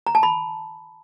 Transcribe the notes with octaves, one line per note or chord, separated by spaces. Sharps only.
A#5
A5
B5